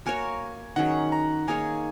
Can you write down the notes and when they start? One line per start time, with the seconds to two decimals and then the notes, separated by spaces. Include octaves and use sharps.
0.06 A#3 F#4 A#4 C#5 G#5
0.76 D#3 F#3 C#4 G#4 F#5
1.12 A#5
1.48 A#3 D#4 G#4 C#5 G#5